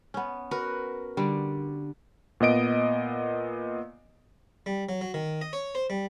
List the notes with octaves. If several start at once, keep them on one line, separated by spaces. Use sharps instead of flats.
B3 C#4
F#4 A#4 B4
D3 G3
A#2 B3 D#5 D7
G3
F#3
F#3
D#3
D#5
C#5
C5
G3